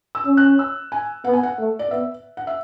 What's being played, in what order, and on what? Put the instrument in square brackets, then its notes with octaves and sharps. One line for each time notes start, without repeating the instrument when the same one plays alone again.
[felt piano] E6
[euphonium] C#4
[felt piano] F#6
E6
G#5
[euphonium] B3 [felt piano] F#5
[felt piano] G#5
F#5
[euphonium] A3
[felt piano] D5
[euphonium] B3 [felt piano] E5
[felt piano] F#5
E5